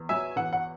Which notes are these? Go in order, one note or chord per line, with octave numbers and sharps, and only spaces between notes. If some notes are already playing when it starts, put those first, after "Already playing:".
Already playing: E2
F#3 E5 G#5
E2 F#5
F#5